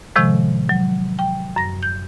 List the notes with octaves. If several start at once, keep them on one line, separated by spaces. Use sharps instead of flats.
A2 C3 D#3 F3 G#3
F#3
G5
F#2 A#6
G6